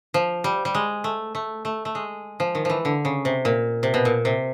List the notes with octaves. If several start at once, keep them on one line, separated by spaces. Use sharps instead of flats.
F3
G3
G3
G#3
A3
A3
A3
A3
G#3
F3
D#3
E3 F3
D3
C#3
C3
A#2
C3
B2
A#2
C3